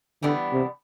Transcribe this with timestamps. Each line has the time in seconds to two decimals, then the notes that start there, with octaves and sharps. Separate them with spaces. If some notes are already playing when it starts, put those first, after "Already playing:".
0.23 D3 E3 G3 B3 D4
0.53 C3